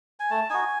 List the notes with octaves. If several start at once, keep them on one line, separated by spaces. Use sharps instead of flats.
G#5
A3 A5
D#4 F#4 G#5